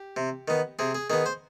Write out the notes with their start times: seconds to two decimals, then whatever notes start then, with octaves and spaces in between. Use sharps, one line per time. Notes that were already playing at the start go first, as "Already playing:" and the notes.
Already playing: G4
0.16 C3
0.48 D#3 B3
0.79 C3 G#4
0.95 G#4
1.10 D#3 B3 G#4
1.26 C5